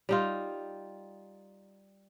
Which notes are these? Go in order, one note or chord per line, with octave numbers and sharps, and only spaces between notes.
G3 D#4 F4